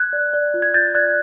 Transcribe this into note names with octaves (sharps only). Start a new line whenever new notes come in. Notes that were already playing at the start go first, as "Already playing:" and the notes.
Already playing: F#6 G#6
D5
D5
F4
G#6
F4 G6 A6
D5 F#6 G#6